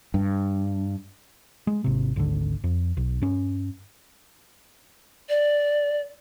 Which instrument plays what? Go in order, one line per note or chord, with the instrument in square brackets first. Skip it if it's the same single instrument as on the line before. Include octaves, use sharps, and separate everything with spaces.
[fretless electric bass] G2
[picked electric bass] G#3
G#1 C3
G#1 D2 D3
F2
B1
G2 C#4
[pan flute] D5